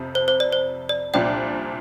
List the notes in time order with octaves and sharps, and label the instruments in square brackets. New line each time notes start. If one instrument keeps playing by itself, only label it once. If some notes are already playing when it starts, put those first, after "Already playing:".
Already playing: [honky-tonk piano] F2 C3 F3
[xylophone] C5
C5
D5
C5
D5
[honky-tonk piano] C2 A#2 F3 D4 [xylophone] D5 G5